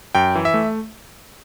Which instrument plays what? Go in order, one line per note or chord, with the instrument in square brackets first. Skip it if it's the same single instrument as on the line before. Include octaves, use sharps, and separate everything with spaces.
[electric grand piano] F#2 G5
E3
E5
A3